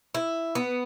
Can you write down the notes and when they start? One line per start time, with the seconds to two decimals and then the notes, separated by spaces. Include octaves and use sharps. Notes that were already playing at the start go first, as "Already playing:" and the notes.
0.14 E4
0.55 B3